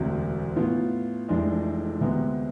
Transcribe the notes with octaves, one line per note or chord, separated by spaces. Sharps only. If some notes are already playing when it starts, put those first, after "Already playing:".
Already playing: E1 D2 C3
A2 F3 B3 F4
F1 F2 E3 G#3 D4
D2 C3 G#3 B3